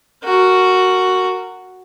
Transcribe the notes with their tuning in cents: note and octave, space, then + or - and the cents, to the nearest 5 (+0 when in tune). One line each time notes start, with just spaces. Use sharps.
F#4 +0 A#4 -15